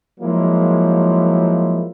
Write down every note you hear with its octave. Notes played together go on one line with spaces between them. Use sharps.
F3 F#3 G#3 A#3 E4